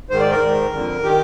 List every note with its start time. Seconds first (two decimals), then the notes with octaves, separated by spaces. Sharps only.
0.09 G#2 D#3 C5
0.20 D5
0.31 A#4
0.42 G#2 D#3
0.73 F2 D3
1.03 D#3 G4